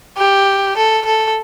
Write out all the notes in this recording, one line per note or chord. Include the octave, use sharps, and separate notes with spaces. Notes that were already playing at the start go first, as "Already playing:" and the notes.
G4
A4
A4